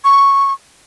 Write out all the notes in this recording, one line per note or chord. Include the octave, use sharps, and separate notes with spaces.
C#6